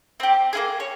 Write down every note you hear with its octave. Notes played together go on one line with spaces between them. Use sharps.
C4 G4
A#3 E4 G#4
C#5